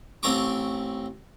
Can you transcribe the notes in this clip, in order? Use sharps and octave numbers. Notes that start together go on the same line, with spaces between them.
A1 C4 A4 A#5 C#6 D6